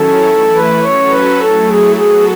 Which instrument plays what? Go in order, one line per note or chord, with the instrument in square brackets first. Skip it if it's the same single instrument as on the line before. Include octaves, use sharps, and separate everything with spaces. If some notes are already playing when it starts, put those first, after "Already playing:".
Already playing: [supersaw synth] D#3 F#3 C#4 E4 [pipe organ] A4
[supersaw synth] E3 A3 E4
[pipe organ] B4
[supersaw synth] F#3 C#4 F#4 A4 [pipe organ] C#5
[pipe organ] B4
[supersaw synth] F#3 A3 E4 [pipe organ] A4
[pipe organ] G#4
[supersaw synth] F#3 B3 F#4 A4 [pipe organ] G#4